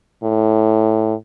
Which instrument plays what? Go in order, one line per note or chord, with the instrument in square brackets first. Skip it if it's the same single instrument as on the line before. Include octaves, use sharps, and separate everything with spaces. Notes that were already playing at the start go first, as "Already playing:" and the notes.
[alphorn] A2